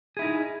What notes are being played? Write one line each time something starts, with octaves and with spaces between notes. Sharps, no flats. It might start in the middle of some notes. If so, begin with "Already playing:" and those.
D#4 E4 G#4